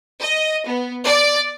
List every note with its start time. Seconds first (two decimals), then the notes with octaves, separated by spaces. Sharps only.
0.20 D#5
0.66 B3
1.05 D5